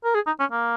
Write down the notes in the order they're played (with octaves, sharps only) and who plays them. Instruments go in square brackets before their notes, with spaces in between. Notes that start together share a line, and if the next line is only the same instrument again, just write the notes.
[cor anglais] A#4
G#4
D#4
C#4
A#3